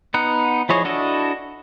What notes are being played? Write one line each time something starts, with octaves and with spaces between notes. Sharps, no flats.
B3 D#4 F#5
F3 E4 G#4 C#5 D#5
D4 E4 F#4 A4 D#5